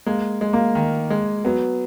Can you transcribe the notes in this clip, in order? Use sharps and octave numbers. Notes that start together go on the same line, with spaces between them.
G#3 A#3
G#3
A#3
D#3
G#3
F#3 B3